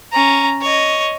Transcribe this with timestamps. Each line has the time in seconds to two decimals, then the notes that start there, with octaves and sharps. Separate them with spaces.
0.12 C#4 A#5
0.61 C#5 D#5